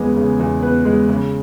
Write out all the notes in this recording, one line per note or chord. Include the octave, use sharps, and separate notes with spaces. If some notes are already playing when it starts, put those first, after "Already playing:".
Already playing: E2 C#3 G#3 B3 G#5
C#3
E2
B3 B4
G#3
C#3